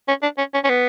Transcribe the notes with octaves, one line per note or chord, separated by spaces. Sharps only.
C#4
D4
C#4
C#4
C#4
B3